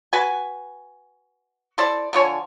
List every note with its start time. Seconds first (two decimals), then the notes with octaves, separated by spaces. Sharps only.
0.13 F#4 B4 G#5
1.78 E4 A4 C5 D5
2.13 D3 F3 C#5 G#5